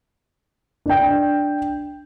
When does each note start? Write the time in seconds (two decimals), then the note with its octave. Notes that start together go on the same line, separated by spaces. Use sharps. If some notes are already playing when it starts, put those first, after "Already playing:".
0.86 D4 G5